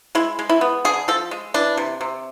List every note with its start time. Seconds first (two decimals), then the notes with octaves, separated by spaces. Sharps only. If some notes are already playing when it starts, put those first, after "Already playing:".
0.15 G#3 E4
0.39 G#3
0.49 E4
0.61 B3
0.85 D3 G#4
1.08 F3 A4
1.31 G#3
1.54 E3 D4
1.77 C3
2.01 C3